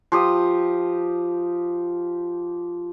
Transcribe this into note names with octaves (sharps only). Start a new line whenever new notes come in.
F3 G4 D#6